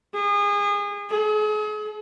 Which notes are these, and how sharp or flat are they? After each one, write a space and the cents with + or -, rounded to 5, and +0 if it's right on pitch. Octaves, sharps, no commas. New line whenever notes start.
G#4 -30
G#4 +40